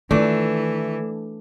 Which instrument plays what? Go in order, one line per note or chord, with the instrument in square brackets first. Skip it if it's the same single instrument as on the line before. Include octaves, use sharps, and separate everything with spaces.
[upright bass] D#3 F4 [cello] E3 [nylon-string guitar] A3 [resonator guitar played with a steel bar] D4